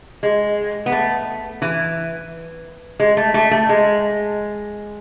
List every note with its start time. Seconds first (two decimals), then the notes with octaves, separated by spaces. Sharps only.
0.23 G#3
0.86 B3
0.92 A3
1.62 E3
3.00 G#3
3.17 A3
3.34 A3
3.51 A3
3.69 G#3